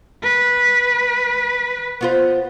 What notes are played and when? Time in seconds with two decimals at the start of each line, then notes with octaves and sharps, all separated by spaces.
0.22 B4
2.01 B3 F4 C5